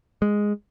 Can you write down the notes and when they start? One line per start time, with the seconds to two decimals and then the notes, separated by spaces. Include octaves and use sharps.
0.22 G#3